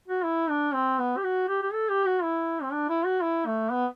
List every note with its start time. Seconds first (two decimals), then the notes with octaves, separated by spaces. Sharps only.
0.08 F#4
0.24 E4
0.50 D4
0.74 C4
0.99 B3
1.17 G4
1.23 F#4
1.48 G4
1.62 G4
1.73 A4
1.89 G4
2.06 F#4
2.23 E4
2.63 C4
2.72 D4
2.89 E4
3.05 F#4
3.22 E4
3.46 A3
3.72 B3